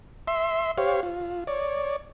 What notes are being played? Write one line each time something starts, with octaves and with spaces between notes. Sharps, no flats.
E5 C6
G4 C5 C#5 F5
F4
C#5 D5